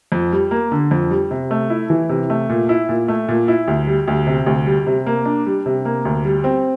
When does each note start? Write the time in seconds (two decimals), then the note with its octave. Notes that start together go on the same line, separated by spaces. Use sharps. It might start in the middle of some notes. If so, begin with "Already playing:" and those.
0.12 F2
0.32 G3
0.51 A#3
0.72 D3
0.91 F2
1.10 G3
1.31 C3
1.51 A3
1.70 E4
1.90 E3
2.09 C3
2.30 A3
2.49 A#2
2.69 E4
2.89 A#2
3.08 A3
3.28 A#2
3.48 E4
3.67 D2
3.87 G3
4.08 D2
4.27 C3
4.46 D2
4.66 G3
4.87 C3
5.06 A#3
5.25 D4
5.46 G3
5.66 C3
5.85 A#3
6.05 D2
6.25 G3
6.44 C4